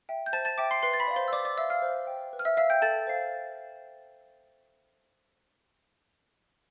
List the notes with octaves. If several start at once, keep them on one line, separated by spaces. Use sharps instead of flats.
E5 G5
G6
C5 A5 A6
A5 A6
E5 G5 D6 D7
C6 C7
B4 C6 C7
A6
B5 B6
D5 F5
C5 C6
E6
B4 D5 D6
D5 D6
D5 E5 F5 E6
F5 F6
C5
G5
B4
F6
E5 E6
E5 F5 E6
G5 G6
A4 A5 A6
C5 F5